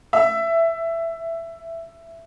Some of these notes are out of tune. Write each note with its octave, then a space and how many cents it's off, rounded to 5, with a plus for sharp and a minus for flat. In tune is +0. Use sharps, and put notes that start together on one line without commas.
E5 +5